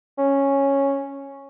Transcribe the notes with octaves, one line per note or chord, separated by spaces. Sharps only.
C#4